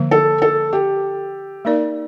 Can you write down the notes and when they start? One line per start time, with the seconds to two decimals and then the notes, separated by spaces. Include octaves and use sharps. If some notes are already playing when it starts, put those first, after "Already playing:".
Already playing: D3 F3 A#3
0.11 A4
0.42 A4
0.73 G4
1.65 A#3 D#4 A#4 D5